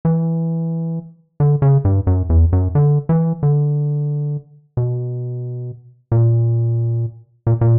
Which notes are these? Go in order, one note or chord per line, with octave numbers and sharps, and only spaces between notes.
E3
D3
C#3
G2
F#2
E2
F#2
D3
E3
D3
B2
A#2
A#2
A#2